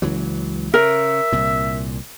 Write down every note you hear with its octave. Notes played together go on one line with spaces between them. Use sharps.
C#2 E3 F#3
C#3 A#4 E5
C2 A#2